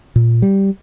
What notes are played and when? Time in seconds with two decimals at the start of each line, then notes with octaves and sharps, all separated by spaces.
0.16 A#2
0.42 G3